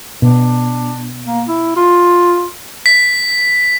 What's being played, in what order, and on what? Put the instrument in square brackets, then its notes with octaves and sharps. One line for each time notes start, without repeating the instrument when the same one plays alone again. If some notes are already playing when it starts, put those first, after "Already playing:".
[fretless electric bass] B2 [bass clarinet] D4
[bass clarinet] A#3
E4
F4
[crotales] B6